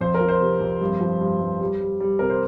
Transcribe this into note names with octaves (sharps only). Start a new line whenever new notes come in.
F2 C5
A#4
F3
C5
C3
F2
G2
F3
G2
G2
G3
G3
G3
C3 A#4
C5